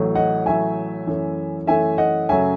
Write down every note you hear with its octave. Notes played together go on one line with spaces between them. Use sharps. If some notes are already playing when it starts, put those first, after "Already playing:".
Already playing: A1 A2 F#3 A3
D#5 F#5
A1 A2 F#3 A3 E5 G#5
F#2 E3 A3
F#2 E3 A3 E5 G#5
D#5 F#5
F#2 C#3 F#3 A3 E5 G#5